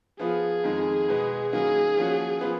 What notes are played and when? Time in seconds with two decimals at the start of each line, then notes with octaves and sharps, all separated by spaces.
0.19 F3 B3 F4 G#4
0.64 F2 D#3 G#3
1.08 B2 G#3 B3
1.53 D#3 F#3 A#3 C#4 G#4
1.97 F3 A#3 C#4 F#4
2.41 F3 B3